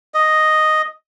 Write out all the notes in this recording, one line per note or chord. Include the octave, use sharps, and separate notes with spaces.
D#5